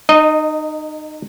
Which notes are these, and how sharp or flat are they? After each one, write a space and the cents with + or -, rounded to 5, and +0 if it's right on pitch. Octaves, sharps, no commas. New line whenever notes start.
D#4 -30 D#5 +0